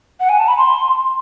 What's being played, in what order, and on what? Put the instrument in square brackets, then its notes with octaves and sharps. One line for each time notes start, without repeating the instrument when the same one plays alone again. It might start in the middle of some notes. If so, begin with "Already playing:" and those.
[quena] F#5
G#5
A5
B5
C6